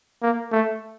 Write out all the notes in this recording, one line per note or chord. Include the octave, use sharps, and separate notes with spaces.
A#3
A3